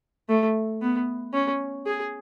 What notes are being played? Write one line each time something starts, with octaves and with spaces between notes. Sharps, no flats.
A3
B3
C#4
G#4